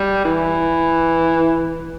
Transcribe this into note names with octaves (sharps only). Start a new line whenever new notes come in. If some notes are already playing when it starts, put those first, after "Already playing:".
Already playing: G3
E3